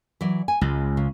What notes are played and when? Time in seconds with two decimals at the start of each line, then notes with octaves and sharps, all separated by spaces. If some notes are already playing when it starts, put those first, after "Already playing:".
0.21 E3 F#3 D5
0.48 G#5
0.61 C#2 G#3
0.97 C#3